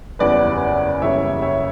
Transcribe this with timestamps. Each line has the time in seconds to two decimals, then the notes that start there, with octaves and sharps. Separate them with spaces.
0.19 F#1 E2 C#3 G3 B4 D5
1.02 F#1 E2 C#3 G3 C#5 E5
1.42 C#5 E5